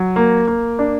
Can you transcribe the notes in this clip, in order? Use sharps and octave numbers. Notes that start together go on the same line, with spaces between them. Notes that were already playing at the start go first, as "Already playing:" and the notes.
Already playing: F#3
A#3
A#3
D4